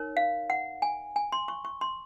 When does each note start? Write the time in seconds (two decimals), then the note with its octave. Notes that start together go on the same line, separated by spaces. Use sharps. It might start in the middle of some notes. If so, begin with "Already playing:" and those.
Already playing: D#4 A#4 C#5
0.17 F5
0.50 F#5
0.82 G#5
1.16 G#5
1.32 C6
1.48 C#6
1.65 C#6
1.81 C6